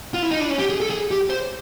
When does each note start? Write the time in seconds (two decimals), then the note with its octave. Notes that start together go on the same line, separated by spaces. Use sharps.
0.14 F4
0.22 E4
0.31 D#4
0.40 D4
0.50 C#4
0.59 G4
0.70 G#4
0.81 A4
0.90 G#4
1.11 G4
1.30 C5